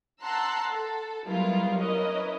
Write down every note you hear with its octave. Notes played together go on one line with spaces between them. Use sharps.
F#5 A5 A#5 C6 E6 F#6
A4
F#3 G3 B3 E4 F4 A#4
C#4 E4 A#4 B4 D#5